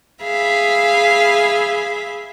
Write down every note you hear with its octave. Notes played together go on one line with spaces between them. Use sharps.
G#4 E5 F5 B5